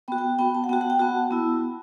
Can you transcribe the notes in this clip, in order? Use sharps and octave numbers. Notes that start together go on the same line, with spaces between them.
B3 F#4 G5
G5
B3 F#4 G5
A5
F#5
B3 F#4 G5
F#5
G5
B3 F#4 A5
B3 E4